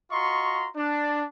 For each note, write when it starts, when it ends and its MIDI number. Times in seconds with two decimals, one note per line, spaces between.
0.11 0.67 65
0.11 0.67 66
0.11 0.67 75
0.11 0.67 82
0.11 0.67 84
0.11 0.67 85
0.76 1.22 62